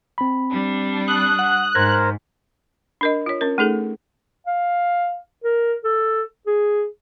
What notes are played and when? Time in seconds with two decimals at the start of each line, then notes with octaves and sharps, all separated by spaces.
0.18 C4 B5
0.50 G3 D4
1.08 D#6 F#6
1.39 F#5
1.75 G#2 A#4 C5 F6 G#6 A#6
3.01 D4 A#4 D#5
3.26 F4 C#5
3.41 C#4 A#4
3.58 A3 D#4 G#4 A4
4.47 F5
5.44 A#4
5.84 A4
6.47 G#4